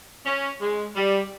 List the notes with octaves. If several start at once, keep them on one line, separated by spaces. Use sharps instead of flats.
C#4
G#3
G3